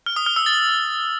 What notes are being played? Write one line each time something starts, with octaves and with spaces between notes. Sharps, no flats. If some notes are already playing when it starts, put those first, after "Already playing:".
F6
D#6
F6
E6
A6